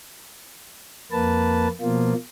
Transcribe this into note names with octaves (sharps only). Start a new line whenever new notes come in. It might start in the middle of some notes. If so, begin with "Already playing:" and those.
F2 A#3 B4 A5
B2 F3 A#3 F4